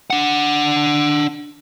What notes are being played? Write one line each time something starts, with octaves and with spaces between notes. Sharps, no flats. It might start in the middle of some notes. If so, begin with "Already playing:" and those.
D4 F#5